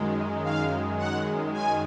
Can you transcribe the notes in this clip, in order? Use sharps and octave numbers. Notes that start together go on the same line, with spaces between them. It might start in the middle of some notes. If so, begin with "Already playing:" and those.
Already playing: F#2 D#3 G#3
F5
F#5
G#5